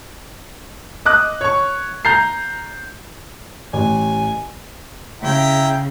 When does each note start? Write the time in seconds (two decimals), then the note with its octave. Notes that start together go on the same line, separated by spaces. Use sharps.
1.06 D#5 D6 F#6
1.41 C#5 C#6
2.05 A#5 G6 A6 C7
3.73 A1 G#5
5.22 C#3 E4 G5 A#5